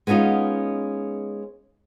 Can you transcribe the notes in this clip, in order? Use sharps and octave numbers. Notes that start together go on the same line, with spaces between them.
G#3 B3 C#4 D#4 F4